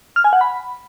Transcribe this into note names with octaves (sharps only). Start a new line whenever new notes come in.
F6
G#5
F#5
B5